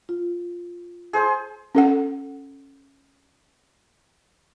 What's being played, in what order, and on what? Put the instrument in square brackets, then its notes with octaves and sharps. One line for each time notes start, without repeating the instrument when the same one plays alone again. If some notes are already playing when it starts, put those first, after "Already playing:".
[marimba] F4
[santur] G#4 C5 A5
[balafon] C#4 A4 F#5